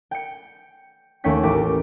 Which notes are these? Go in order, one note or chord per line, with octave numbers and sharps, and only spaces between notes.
G5 C#7
D#2 A3 C#4 C#5 G5 B6
A1 G4 A#4 G5 D6 B6